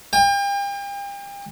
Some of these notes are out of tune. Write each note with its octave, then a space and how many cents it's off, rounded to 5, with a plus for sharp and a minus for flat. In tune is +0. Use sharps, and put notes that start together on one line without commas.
G5 +40